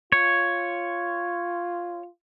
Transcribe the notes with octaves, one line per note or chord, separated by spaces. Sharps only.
F4 C#5